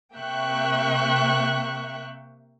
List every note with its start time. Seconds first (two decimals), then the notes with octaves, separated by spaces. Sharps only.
0.15 C3 A#3 E5 G5 C#6 F#6